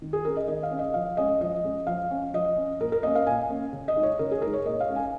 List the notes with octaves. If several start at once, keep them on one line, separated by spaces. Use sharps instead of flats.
D#3
G#4
C#4 A#4
D#5
D#3 D#5
F5
C#4
D#5
F3 F5
G#3 C#4 D#5
F3 D#5
G#3 C#4
F3 F5
C#4
F3 D#5
C#4
A#2 A#4
A#4
A#3 C#4 D#5
F5
A#2 G#5
A#3 C#4
C#3
D#5
G#3 D#4
C#5
C#3 A#4
G#4
G#3 D#4 A#4
C#5
A#2 D#5
F5
G#3 C#4
G#5